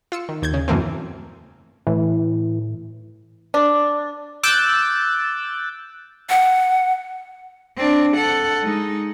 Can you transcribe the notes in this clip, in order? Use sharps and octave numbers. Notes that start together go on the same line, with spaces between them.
F4 E6 C#7
D#3
D#2 G6 G#6
C#3
F#2 B2 E3 A3 A#3 C4
A2 E3
D4
D6 E6 F#6 G6 A6
F#5
C4 D4
A4 F#5
G#3 D#4